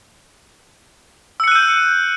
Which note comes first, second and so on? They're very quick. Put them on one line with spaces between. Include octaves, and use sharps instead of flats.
E6 C#7 F#6 D#7 G6